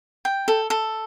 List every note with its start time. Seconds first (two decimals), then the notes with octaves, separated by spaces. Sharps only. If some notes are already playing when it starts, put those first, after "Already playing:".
0.25 G5
0.48 A4
0.70 A4